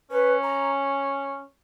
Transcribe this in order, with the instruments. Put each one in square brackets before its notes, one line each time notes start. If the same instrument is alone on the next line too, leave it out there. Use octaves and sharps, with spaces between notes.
[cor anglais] C#4 [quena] B4
[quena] A#5